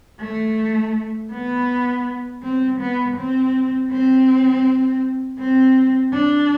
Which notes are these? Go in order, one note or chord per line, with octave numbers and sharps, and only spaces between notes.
A3
B3
C4
B3
C4
C4
C4
D4